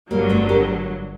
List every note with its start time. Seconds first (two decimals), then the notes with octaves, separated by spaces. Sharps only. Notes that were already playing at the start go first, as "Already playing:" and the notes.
0.11 G1 G2 D3 F#3 G3 A#3
0.29 A3 C4
0.49 G4 A#4